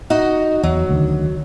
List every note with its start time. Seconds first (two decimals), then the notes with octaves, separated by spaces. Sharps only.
0.10 D#4 F#4 D#5
0.63 E2 F#3
0.89 D2 D#3